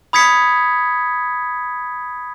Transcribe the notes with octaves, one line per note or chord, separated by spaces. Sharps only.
B5 D#6 G#6 B6 C#7